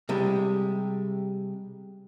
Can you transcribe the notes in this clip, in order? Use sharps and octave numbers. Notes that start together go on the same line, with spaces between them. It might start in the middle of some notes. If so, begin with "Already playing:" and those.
C3 G3 G#3